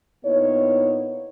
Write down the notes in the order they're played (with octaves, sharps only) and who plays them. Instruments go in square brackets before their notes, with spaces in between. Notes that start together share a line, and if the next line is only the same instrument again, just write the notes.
[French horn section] A#2 B3 D#4 E4 C#5